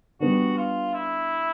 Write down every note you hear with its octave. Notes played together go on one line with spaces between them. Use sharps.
G3 B3 D4 F#4
F4
E4